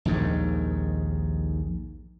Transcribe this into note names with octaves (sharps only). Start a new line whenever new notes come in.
A#1 D#2 G#2 D#3